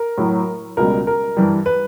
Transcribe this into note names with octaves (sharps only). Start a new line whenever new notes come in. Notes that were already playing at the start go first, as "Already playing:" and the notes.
Already playing: A#4
A2 F#3
C#2 B2 G3 A#4
A#4
G2 E3 G3
B4